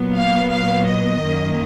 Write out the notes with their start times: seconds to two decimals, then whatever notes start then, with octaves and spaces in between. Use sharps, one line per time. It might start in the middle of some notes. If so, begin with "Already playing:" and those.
Already playing: A#2 F#3 B3
0.14 F5
0.50 F5
0.87 D#5
1.23 F#2 D#3 A#3